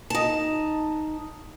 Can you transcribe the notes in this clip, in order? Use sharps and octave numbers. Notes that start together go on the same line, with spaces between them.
D#4 A5